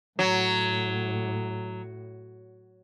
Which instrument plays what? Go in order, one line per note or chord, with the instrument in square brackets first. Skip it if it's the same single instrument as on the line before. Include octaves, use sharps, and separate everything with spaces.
[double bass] A2 [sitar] F#3